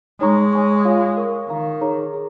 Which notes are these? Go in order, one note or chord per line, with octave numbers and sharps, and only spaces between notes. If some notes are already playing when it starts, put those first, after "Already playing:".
G#3 D#4 C#5 A#5 C#6
C#5 G#5 C#6
F4 C#5 F5
A#4 F5 C#6
D#3 A#4 F5 A#5 C#6
D#4 G#4 C#5 A#5
G#4